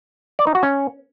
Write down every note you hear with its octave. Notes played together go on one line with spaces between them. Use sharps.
D5
D#4
F#4
C#4